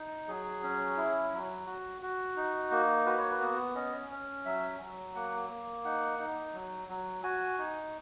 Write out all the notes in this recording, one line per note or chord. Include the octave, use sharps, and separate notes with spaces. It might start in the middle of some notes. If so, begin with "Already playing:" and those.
Already playing: D#4
F#3 G#4
C#4
E4
F#3
F#4
F#4
D#4
A#3
F#4 B4
C#5
B4
B3
C#4 D#5
C#4
F#3 E5
F#3
A#3 F#5
A#3
D#4 F#5
D#4
F#3
F#3
F#4 G#5
D#4